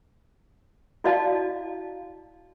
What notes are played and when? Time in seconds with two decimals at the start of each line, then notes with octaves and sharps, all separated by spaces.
1.04 E4 F#4 D5 D#5 F5 A5